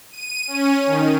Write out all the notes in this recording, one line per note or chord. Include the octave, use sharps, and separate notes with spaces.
D#7
C#4
D#3